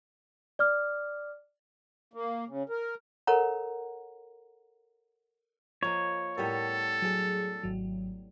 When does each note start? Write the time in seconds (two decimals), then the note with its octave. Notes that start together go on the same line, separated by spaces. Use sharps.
0.59 D5 D6 F6
2.14 A#3
2.48 C#3
2.69 A#4
3.27 A4 A#4 C#5 F#5 A#5
5.83 F3 A#3 C#5 D#5
6.38 A2 G3 B3 A4 A#4
7.02 F#3 G#4
7.63 G#1 F#3